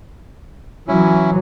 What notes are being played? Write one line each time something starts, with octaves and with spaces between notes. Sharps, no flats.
E3 F#3 C#4 E4